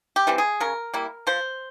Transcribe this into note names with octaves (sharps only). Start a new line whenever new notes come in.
G4
E3 G3 C4
G#4
C#3 A#4
G3 A#3 E4
F3 C5